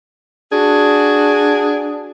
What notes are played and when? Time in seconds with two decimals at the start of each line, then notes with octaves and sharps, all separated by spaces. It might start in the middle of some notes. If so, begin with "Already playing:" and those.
0.52 D4 F#4 G#4